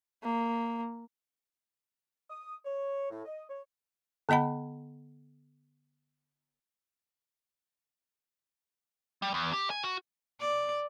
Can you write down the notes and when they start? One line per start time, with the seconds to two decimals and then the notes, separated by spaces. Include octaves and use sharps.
0.23 A#3
2.30 D#6
2.65 C#5
3.10 A2
3.25 D#5
3.48 C#5
4.29 D3 B3 D#5 F#5 B5
9.22 G3
9.34 E2
9.53 G4
9.70 G#5
9.83 F#4
10.40 D5